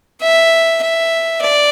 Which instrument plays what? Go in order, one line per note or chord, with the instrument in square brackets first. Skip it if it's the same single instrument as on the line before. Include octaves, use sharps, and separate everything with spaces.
[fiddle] E5
E5
D5